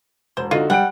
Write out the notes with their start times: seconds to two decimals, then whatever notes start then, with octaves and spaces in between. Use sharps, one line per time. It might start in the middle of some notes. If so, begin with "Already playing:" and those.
0.37 E1 C5
0.51 D3 D#4 F4 F#4
0.70 G3 F#5 G5 D7